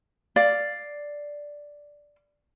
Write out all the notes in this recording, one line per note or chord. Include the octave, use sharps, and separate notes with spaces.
D5 F5